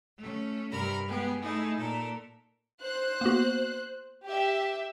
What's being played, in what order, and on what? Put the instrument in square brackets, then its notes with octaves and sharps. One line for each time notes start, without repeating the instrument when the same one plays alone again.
[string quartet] A3 C#4
G2 C3 A#4 A#5 B5 F6
G#3 B3 G4 G#4
A3 D#4 E4 G#4
A#2 A4 A#4
[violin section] C5 F#6
[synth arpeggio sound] A#3 B3 F#4
[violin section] G4 E5